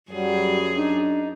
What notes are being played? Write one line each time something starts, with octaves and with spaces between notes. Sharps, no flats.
F#2 F#3 G3 G#4
D4 D#4